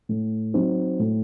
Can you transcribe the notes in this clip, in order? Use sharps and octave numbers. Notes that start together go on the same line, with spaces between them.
A2
F#3 C4 D#4
A2